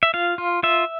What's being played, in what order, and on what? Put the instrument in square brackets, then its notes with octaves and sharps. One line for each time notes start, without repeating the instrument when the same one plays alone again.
[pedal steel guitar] E5
F4 F5
F4
F4 E5